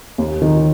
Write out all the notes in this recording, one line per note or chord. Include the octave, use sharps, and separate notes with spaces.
D#2
D#3